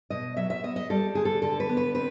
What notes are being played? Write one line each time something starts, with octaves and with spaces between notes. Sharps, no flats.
B2 D#5
F#3 E5
E5
B3 D#5
D#5
G3 A4
D3 G#4
A4
D3 A4
B4
B3
B4
C4 B4